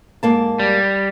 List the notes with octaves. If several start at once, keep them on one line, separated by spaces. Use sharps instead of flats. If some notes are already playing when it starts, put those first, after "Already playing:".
G#2 A#3 A5
G3